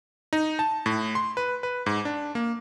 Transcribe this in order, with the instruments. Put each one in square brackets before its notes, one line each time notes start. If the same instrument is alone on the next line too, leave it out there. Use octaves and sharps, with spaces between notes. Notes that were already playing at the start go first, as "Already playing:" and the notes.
[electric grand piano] D#4
A5
A2
C6
B4
B4
G#2
D4
A#3